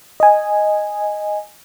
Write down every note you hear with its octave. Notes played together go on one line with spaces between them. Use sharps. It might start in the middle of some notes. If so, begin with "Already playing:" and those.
D#5 G#5